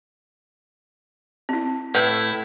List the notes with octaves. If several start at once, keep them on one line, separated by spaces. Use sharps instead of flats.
C4 E4
A2 E4 B4